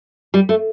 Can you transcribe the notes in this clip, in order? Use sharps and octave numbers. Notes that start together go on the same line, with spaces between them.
G3
A3